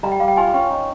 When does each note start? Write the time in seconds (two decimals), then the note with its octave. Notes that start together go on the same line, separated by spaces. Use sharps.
0.03 G3 A#5
0.12 G5
0.20 G3 F5
0.28 G5
0.37 F4 G#5
0.54 C#4 G5
0.71 D#4